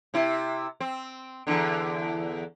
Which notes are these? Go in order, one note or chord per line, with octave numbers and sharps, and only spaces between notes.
C3 E4
C4
E2 D3